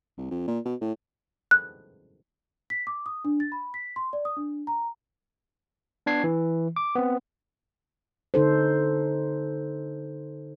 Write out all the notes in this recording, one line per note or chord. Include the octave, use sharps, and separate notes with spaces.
C2
F2
A#2
B2
A2
F#6
B6
D6
D#6
D4
A6
B5
B6
C6
D5
D#6
D4
A#5
B3 D4 G#6 C7
E3
D6
B3 C4
D3 D#4 A4 C5